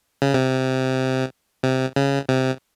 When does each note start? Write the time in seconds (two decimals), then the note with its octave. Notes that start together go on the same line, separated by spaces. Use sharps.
0.22 C#3
0.34 C3
1.63 C3
1.96 C#3
2.29 C3